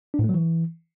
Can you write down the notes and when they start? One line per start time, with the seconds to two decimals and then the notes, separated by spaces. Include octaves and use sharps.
0.14 D4
0.19 A2
0.24 A3
0.29 F#3
0.34 E3